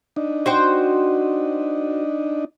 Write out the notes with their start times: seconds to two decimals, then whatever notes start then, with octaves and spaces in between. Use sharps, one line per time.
0.16 D4 D#4
0.46 F#4 C5 G5